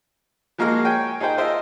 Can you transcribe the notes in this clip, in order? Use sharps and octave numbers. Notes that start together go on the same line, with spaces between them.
F3 G#3 A#3 F#4 G#4 F6
C#5 G5 G#5
D#4 G#4 A#4 C5 G5
F4 C5 D#5 E5